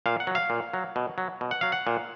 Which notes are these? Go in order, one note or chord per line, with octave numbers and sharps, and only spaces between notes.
A#2 F5
F#5
F#3
F5
A#2
F#3
B2
F#3
B2
F#5
F#3 F5
F#5
A#2